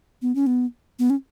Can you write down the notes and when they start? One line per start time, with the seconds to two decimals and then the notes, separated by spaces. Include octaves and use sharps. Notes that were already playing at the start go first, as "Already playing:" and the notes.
0.22 B3
0.35 C#4
0.47 B3
0.99 B3
1.10 C#4